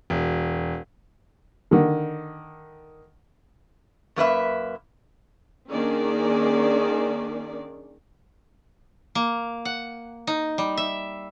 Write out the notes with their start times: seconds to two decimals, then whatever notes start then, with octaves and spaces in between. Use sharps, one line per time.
0.10 E1
1.71 D3 D#3
4.16 F#2 A#3 B4 E5
5.70 D#3 A#3 C#4 D4 G#4 D5
9.15 A#3
9.65 F#5
10.27 D#4
10.58 G3
10.77 E5